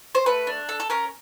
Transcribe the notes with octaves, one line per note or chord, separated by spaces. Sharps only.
C5
A3 B4
D4
A4
A4
C#4 A#4